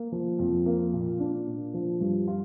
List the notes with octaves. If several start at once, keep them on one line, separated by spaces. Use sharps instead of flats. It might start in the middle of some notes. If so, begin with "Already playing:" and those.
Already playing: A#3
F3
F2
A#3
A#2
D4
A#2
F3
G2
F4